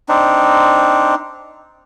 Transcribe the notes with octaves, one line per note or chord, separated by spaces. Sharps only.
C4 D4 D#4